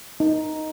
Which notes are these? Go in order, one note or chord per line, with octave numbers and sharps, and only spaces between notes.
D#4